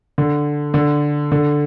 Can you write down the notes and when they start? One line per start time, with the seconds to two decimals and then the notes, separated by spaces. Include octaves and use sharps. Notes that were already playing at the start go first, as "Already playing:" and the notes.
0.18 D3
0.74 D3
1.32 D3